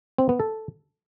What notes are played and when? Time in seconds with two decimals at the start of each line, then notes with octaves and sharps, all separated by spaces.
0.18 C4
0.29 B3
0.39 A4